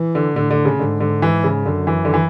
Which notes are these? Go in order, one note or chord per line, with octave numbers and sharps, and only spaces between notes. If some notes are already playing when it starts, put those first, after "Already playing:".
Already playing: E3
D3
A2 D3
D3
C#3
G#2 D3
D3
E3
C#3
F#2 D3
E3
D3
E3